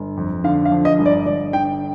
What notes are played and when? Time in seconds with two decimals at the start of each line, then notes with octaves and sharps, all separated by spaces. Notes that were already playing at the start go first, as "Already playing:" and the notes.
Already playing: G1
0.17 F2
0.44 D3 F5
0.65 F5
0.72 F3
0.85 D#5
0.99 G1
1.06 D5
1.26 G1 D5
1.53 D3 G5